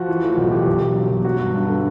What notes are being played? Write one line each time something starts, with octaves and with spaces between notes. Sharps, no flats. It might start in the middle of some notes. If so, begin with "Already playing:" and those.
Already playing: F3 F#4
E3
A2
B1 F#4
E3 G4
B1
B1
F#3
B1
F#3 F#4
G2
G2
D3